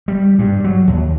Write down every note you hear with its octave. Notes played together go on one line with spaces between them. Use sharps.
G3
G2
F#3
D#2